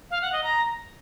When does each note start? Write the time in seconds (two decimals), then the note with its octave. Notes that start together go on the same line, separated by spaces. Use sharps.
0.11 F5
0.22 F#5
0.33 D#5
0.44 A#5